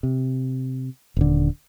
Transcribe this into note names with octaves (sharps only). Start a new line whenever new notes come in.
C3
D#1 D3